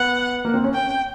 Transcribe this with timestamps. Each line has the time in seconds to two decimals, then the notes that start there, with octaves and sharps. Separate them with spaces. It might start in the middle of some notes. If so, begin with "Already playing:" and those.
Already playing: B3 F#5
0.45 A#3
0.54 C4
0.64 C#4
0.74 G5